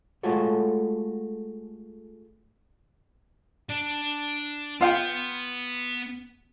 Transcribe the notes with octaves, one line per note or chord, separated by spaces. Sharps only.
G#3 A3 F4 F#4 A4 C#5
D4
B3 F4 F5 G5